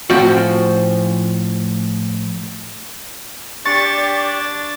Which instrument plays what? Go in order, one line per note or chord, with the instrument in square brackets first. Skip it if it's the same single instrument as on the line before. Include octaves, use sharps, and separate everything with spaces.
[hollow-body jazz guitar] A2 F3 C4 C#4 F4 F#4
[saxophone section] D4 [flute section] G4 D5 [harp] C#6 [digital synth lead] A6